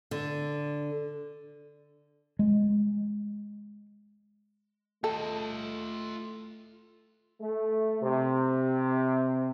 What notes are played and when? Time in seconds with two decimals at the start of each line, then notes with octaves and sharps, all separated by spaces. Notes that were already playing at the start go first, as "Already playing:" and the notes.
0.11 D3
2.39 G#3
5.04 A3 F4 A4 D#5
7.41 A3
8.02 C3